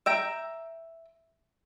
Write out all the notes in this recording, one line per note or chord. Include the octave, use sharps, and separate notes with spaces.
E5 G5 A#5